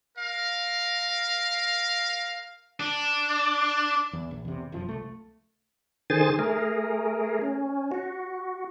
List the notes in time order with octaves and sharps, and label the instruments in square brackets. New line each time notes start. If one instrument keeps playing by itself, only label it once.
[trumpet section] A#4 F5
[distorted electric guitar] D4
[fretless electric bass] E2
A#1
E2 C3
E1 F#2 F3
C2 A3
[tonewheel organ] D3 D#3 G#4 C5 G#5 A6
A3 G#4 A#4
C#4
F#4